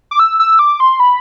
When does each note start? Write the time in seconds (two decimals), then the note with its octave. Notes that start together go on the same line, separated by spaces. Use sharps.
0.11 D6
0.20 E6
0.40 E6
0.59 D6
0.80 C6
1.00 B5